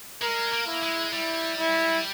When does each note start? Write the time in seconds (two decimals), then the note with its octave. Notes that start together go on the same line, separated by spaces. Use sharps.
0.22 G#3 A#4
0.52 A#3
0.67 E4
0.83 G#3
1.13 G3 E4
1.58 E4